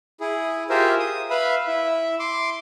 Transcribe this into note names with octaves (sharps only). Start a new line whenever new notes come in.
E4 G#4
F4 G4 G#4 A#4 C5 E5
D#6
B4 E5 F5 B5
E4 E5
C6 D6